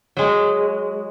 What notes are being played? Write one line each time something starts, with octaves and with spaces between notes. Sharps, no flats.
F#3 G#3